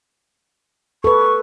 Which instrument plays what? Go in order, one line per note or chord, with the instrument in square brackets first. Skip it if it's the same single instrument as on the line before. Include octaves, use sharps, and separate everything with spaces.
[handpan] A4 B4 [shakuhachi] C#6